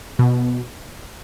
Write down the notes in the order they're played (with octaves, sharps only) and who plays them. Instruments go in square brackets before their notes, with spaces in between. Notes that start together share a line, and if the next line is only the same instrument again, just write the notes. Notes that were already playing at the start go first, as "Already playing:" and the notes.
[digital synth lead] B2